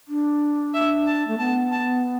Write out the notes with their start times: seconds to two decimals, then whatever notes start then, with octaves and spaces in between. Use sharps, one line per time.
0.08 D4
0.74 E5
1.06 A5
1.28 A3
1.39 B3 A5
1.72 A5